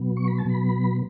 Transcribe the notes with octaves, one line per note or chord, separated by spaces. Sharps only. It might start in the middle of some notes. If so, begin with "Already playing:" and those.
Already playing: B2 F#3 B3
C#6
B5
A5
B2 F#3 B3 B5